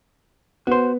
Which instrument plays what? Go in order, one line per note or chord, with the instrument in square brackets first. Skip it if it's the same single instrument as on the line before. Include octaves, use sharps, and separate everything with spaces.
[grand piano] B3 [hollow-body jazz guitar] F#4 C5